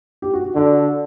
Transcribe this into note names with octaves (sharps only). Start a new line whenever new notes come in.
G4
F#4
F#4
D3 F#4